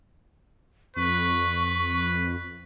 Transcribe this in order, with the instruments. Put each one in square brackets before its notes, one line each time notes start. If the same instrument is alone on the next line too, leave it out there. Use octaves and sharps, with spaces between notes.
[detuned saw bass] F2 [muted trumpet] B4 [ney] C#6